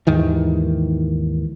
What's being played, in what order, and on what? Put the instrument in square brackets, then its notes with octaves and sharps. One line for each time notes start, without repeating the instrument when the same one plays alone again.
[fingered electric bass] D#2 G#2 D#3 E3